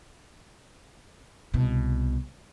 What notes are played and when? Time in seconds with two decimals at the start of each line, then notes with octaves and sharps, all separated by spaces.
1.54 C2 B2